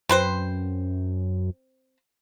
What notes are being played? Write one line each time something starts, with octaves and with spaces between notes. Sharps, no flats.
F#2 C4 B4 C5